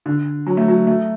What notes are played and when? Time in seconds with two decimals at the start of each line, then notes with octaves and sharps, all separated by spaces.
0.06 D3
0.47 F#3
0.57 A3
0.68 F#3
0.87 A3